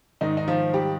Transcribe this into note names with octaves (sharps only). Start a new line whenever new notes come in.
G#2 D#3 D#4
D#4
F3 F4
G3 G4